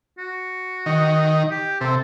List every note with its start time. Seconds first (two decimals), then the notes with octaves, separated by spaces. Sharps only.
0.18 F#4
0.86 D#3
1.51 G4
1.81 C3 A4